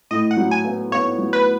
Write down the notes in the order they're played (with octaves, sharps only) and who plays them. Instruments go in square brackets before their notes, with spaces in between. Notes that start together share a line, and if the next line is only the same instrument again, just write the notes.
[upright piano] A2 [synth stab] D#5
[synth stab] F#5
[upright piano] F#3
[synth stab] G#5
[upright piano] B3
[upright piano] B3 [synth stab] C#5
[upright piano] F#3
[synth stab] B4